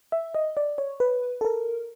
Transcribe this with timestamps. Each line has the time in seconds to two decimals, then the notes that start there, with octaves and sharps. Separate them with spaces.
0.12 E5
0.35 D#5
0.57 D5
0.78 C#5
1.00 B4
1.41 A4
1.45 A#4